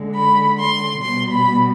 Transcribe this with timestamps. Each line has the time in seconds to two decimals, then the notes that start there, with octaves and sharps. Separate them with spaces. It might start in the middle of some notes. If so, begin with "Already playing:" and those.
Already playing: D3 G#3
0.16 B5
0.59 C6
1.02 B2 G3 C6
1.31 B5